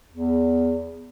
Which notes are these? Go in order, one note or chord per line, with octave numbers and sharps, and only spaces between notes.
E2